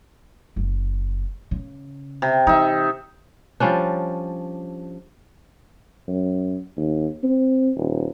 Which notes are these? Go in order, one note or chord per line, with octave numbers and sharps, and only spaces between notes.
F#1
C#3
C3
E3 D#4 E5
F3 G3 C#4 D4
F#2
D#2
C4
D#1